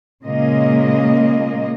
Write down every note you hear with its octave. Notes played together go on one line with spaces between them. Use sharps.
A#2 C#3 G#3 A#3 D#5